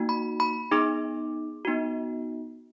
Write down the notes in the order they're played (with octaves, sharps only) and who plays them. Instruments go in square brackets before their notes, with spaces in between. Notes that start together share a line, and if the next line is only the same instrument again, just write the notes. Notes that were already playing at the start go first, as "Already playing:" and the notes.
Already playing: [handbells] A#3 D#4 F#4
B5
B5
B3 D#4 G#4 D6
B3 D#4 F#4